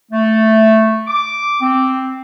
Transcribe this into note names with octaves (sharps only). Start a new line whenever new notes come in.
A3
D6
C4